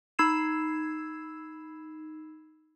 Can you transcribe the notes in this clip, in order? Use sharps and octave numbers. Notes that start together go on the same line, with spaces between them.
D#4 B5 E6 G#6 C7 E7